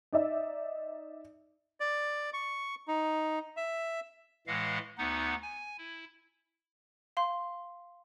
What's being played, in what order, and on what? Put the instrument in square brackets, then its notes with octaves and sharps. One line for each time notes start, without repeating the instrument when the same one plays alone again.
[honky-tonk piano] D#4 D5 E5
[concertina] D5
C#6
D#4
E5
[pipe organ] A2 E3 G#3 D#5 F5 F#5
D2 B3 D#4 F#5
G#5
E4
[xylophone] F5 C6